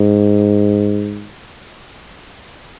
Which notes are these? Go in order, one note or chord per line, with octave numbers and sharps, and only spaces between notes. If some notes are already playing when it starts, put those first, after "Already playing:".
Already playing: G#2